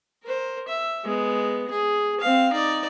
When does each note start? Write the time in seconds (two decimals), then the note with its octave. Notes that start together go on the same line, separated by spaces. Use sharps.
0.24 A#4 C5
0.68 E5
1.05 G#3 B3
1.71 G#4
2.20 C4 F5
2.52 D#4 D5